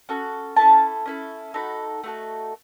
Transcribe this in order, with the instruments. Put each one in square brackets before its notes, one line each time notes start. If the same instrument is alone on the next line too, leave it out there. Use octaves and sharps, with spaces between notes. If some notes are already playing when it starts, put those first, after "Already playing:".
[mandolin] C#4 F#4 A4
C#4 E4 A4 A5
C#4 E4 A4
A3 D#4 F#4 A4 B5
A3 D#4 F#4 A4